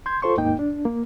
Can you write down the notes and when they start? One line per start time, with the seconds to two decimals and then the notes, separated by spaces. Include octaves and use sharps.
0.06 C6 G6 G#6
0.22 F4 A4 C5 C6 C#6
0.37 D#2 G#2 A#3 D#4 G5
0.59 D4
0.85 A#3